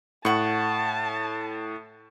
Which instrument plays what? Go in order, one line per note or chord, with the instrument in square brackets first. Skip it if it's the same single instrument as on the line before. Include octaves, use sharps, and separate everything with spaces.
[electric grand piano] A2 [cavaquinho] F#5 C#6 [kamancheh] A5